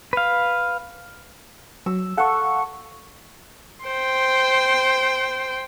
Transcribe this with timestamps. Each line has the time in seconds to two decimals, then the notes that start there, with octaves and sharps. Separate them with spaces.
0.13 B4 F5
1.86 F#3 E6
2.17 A4 F5 F#5 C#6
3.85 C5 G5